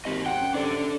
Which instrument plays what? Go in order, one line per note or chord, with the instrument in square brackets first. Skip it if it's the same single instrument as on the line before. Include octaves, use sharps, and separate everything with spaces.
[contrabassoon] G#1 [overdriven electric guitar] G4 D#5
[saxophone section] C3 C5 F#5 [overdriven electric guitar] G5
[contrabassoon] F#2
[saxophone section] C3 D5 [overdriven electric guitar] D4 A4
[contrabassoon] F#2